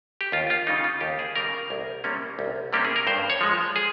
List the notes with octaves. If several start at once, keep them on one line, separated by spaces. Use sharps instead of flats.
G4
D#2 F4
F4
C#3 G3 D#4
F4
D#2 G4
G#4
C#3 G3 A#4
C2
C3 G3 A#3 C#4
C2
C3 G3 A#3 C#4 G4
G#4
A#4
G2 C5
C#5
F3 G#3
G#4